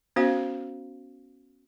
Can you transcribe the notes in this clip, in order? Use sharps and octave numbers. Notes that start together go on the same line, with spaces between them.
B3 C#4 F#4 C5 F5